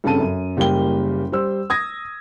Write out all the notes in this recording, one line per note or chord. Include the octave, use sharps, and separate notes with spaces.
G2 C#3 C4 A4 A5 D#7
F#2
F#1 G3 A#3 G5 G7
G3 C5 E6
D#6 G#6 A#6